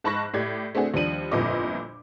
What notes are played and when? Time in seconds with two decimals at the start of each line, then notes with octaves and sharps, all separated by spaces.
0.04 G#2 A5 B5 C#6 F#6 A#6
0.34 A2 G4 D5 G#6
0.75 A3 C4 D4 F#4 G#4
0.94 D#2 F3 G3 D4 D#7 F#7
1.31 G1 F2 A#2 E4 D#5 D6